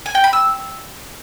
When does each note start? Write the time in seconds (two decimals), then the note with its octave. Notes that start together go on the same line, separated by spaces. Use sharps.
0.06 G#5
0.15 G5
0.24 B5
0.33 E6